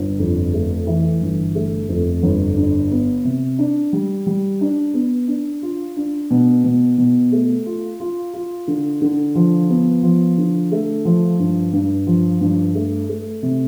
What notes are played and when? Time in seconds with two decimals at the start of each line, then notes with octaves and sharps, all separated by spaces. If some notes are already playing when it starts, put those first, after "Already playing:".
Already playing: G1
0.19 F2
0.53 A3
0.87 E3
1.22 G1
1.55 A3
1.89 F2
2.23 G1
2.57 D4
2.91 B3
3.24 C3
3.59 D4
3.93 G3
4.26 G3
4.61 D4
4.94 B3
5.28 D4
5.62 F4
5.97 D4
6.30 B2
6.64 B2
6.98 B2
7.32 A3
7.66 F4
8.00 F4
8.34 F4
8.67 D3
9.01 D3
9.35 F3
9.69 B3
10.03 F3
10.37 D3
10.72 A3
11.05 F3
11.39 G2
11.73 G2
12.07 F3
12.41 G2
12.75 A3
13.09 A3
13.42 C3